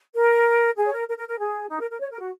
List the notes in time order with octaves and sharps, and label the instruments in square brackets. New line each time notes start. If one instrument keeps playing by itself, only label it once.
[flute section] A#4
G#4
C#5
A#4
A#4
A#4
A#4
G#4
D#4
A#4
A#4
C#5
A#4
F#4